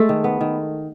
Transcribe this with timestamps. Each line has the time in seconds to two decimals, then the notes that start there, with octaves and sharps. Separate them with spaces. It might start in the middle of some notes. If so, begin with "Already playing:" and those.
Already playing: G#3 A3 A4
0.09 D#3
0.24 B3
0.41 D#3